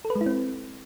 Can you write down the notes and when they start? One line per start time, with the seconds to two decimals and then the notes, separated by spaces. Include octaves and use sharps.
0.05 A4
0.10 B4
0.16 G#3
0.21 E4
0.26 C4